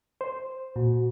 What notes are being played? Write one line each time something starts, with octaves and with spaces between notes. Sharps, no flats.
C5
A#2 F#4